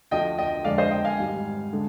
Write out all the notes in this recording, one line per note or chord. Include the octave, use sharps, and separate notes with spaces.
D2 D3 F3 D#5 G5
D#5 G5
F2 D3 G#3 D5 F5
C5 D#5
D#5 G5
F5 G#5
G#1 G#2 G3
D3 G#3